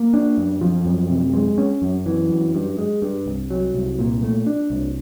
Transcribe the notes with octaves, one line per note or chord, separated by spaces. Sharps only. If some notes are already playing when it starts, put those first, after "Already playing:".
Already playing: A#3
D4
F#2
F3
F#2
C3
G#3
C#4
F#2
E3
F#2
G2
G#3
G2
C2
F#3
C2
A#2
A3
D4
C2